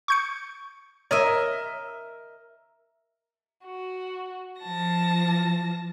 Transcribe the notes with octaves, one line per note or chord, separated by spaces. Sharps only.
C#6 G6 C#7
A#4 C#5 D#5 E5
F#4
F3 A5 A#6